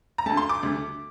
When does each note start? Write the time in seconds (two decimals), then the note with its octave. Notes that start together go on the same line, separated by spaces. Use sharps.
0.18 A#5
0.26 D2 D3 A3 A5
0.37 C6
0.49 D6
0.63 D2 D3 A3